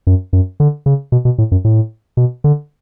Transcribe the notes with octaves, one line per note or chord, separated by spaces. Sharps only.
F#2
F#2
D3
C#3
B2
B2
A2
F#2
A2
B2
D3